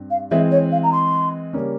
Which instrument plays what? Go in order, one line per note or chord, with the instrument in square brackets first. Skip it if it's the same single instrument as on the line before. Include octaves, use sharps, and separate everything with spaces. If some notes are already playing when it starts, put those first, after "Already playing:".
Already playing: [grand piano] G2 C4
[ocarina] F5
[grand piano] E3 G#3 C4 [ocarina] E5
[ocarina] C#5
F5
A#5
C6
[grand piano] C#3 G3 A#3 C#4